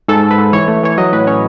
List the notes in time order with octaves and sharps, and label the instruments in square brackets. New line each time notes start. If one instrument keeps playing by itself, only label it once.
[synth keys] G#2 A4
G#2
B4
G#2
E3 C#5
A3
E3 C#5
F#3 D#5
A2 B4
C#4 C#5